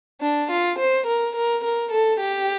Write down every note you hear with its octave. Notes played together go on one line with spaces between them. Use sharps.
D4
F4
C5
A#4
A#4
A#4
A4
G4